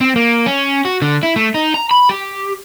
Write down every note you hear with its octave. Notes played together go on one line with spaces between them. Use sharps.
C4
A#3
C#4
F#4
D3
E4
A3
D#4
A#5
B5
G4